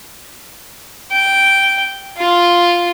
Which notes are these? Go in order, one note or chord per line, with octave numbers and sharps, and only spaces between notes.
G5
F4